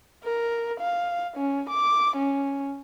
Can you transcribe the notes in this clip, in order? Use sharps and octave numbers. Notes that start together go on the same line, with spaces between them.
A#4
F5
C#4
D6
C#4